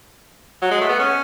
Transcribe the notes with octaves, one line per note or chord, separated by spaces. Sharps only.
F#3
G#3
A3
B3
C#4